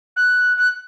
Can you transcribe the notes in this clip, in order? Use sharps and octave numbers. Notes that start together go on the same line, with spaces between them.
F#6
F#6